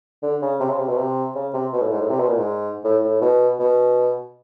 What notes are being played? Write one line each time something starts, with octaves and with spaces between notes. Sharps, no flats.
D3
C#3
C3
C#3
C3
B2
C3
C#3
C3
B2
A2
G#2
A2
C3
B2
A#2
G#2
A2
A2
B2
B2